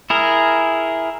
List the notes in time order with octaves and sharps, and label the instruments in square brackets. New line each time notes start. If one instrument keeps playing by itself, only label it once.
[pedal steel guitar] E4 G#4 A#4